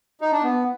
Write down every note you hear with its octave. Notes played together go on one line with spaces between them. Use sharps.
D#4
D4
B3